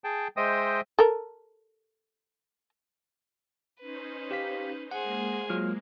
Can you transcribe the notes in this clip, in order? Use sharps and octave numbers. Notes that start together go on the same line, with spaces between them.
G#4 G5 A5
G#3 C5 D#5 E5 G5 D#6
A4 A#4
C#4 D#4 B4 C5
G4 F5 B6
G#3 A#3 G#4 C5 F#5
F#3 F4 F6